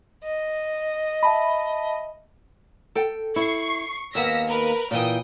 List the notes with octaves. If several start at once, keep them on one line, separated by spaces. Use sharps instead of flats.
D#5
E5 A5 B5
A4 G5
E4 C#6 C7
D#2 A#3 B3 E6 A#6 B6
A#4 B4
A#2 E3 G5 D#6